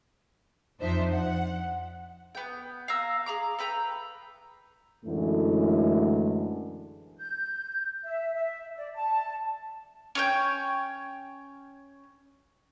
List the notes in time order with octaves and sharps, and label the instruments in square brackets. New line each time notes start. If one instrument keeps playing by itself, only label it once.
[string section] F2 F3 D4 D#4 C5 E5
F#5
[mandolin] B3 G5
F5 G#5 A#5 E6
G#4 A#5 D6
A4 B4 G5 A#5
[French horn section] F#2 A2 D3 E3 G#3 A3
[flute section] G6
E5
E5
D5
A5
[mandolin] C#4 C#5 G5